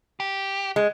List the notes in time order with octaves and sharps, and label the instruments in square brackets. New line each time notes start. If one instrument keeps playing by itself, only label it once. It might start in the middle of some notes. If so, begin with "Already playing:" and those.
[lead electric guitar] G4
[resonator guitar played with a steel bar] G#3